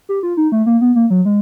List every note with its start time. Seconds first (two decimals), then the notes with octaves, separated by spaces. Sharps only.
0.09 G4
0.23 F4
0.37 D#4
0.52 A3
0.66 A#3
0.81 B3
0.95 A#3
1.10 F#3
1.25 G#3